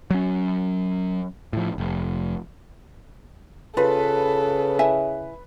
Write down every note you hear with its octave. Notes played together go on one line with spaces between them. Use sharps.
F#3 C#4
A2 F3
F1
C#3 F4 A4 B4
E4 E5 G#5